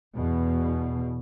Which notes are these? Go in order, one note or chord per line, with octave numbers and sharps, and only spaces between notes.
E2 B2